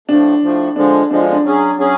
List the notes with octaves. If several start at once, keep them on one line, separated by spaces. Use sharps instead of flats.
A2 F3 A3 D4
A2 F3 A3
D3 F3 G#3 D4
D3 F3 G#3 D4
F4
D4
F#3 C#4 G#4
F#3 C#4 G#4